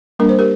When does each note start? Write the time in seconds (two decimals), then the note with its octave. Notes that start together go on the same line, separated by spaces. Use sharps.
0.19 G3 A#3 D4 A#4
0.29 C5
0.39 G4 A#4